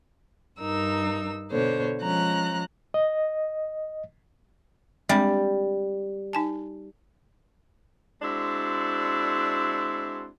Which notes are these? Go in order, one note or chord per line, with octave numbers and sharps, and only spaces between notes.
G2 D#4 A#4 E6
B2 D3 C5 C#5
F3 G#3 C#4 A#5 F#6
D#5
G3 G#3 C4 D4
D#4 G#5 A5
G#3 C4 D4 E4 F#4